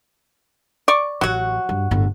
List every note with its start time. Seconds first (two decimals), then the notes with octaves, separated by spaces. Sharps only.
0.88 D5 C#6
1.21 A1 F#3 F#4
1.69 G2
1.91 G1 A2